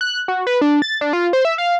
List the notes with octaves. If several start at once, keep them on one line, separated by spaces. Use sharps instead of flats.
F#6
F#4
B4
D4
A6
D4
F4
C5
E5
F5